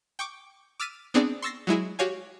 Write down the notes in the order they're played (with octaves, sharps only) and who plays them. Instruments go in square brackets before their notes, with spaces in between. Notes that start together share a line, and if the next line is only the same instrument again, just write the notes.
[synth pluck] G5 C#6 D6
D6 E6 F6 A6 B6 D#7
B3 C4 D4 G#4 D5
C6 C#6 E6 A6 A#6 C7
F#3 G#3 E4 G#4
F#4 G4 C#5 F5 G#5